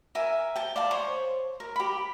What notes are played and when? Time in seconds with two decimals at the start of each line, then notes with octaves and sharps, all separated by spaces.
0.15 A#4 E5 G#5
0.56 G5 A5
0.76 D5 F5 A5
0.91 C5 C#5
1.60 A#4
1.76 G4 B5